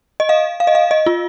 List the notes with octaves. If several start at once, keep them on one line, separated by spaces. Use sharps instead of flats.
D#5
F5
F5
D#5
F5
D#5
F4